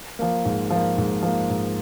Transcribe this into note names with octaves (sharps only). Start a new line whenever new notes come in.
F3 A#3
G#2
F3 A#3
G#2
F3 A#3
G#2